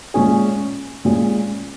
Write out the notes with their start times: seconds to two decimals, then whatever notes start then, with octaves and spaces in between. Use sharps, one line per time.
0.14 A#2 G#3 C#4 G#4
1.05 A#2 G#3 C#4 G#4